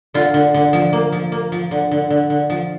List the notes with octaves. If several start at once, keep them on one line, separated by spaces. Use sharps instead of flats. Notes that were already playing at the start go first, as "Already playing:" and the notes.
D3 F4
D3
D3
F3
A#3
F3
A#3
F3
D3
D3
D3
D3
F3